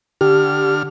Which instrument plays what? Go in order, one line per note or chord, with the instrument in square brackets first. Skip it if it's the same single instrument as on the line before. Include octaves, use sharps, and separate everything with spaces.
[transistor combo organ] D3 F6 [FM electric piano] G4